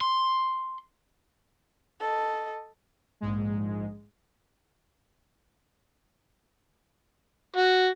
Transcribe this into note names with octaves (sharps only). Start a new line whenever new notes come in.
C6
A4 D#5
A#1 G#2 G#3
F#4